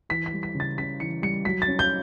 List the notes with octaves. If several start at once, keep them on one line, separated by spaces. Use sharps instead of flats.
E3 B6
B6
G3
B6
C#3
A6
C#3 B6
E3 C#7
G3 C#7
F#3 B6
A6
C#4
G6